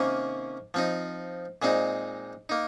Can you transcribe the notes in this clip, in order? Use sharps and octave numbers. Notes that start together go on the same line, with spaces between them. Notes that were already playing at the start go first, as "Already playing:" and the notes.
Already playing: C3 D#3 A#3 C#4
F3 C4 D#4
A#2 G#3 C4 D#4
A#3 D#4